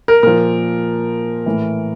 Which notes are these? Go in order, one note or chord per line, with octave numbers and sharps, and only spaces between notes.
A#4
A#2 F3 A#4
A2 E3